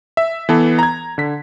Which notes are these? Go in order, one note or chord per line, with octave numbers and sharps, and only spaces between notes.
E5
E3 B3 A4
A#5 G#6
D3 B6